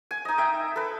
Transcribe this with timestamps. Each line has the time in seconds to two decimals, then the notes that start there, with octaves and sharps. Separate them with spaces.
0.11 G#5
0.25 D#4 D#5
0.38 E5 G5
0.76 A4 B4